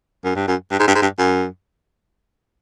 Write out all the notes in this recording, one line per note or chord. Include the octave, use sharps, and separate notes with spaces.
F#2
G2
F#2
G2
G#2
G2
G#2
G2
F#2